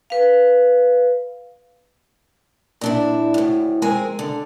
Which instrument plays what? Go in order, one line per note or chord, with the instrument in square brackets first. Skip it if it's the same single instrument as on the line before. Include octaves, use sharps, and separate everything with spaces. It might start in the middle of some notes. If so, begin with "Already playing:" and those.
[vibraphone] B4 F5
[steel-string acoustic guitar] A#2 D4 E4
D2 A2
F2 G#3 C4 A#4 G#5
D3